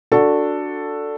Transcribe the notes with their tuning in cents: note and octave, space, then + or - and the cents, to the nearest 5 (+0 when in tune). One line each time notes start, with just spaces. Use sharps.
D4 +0 F#4 -10 A4 +5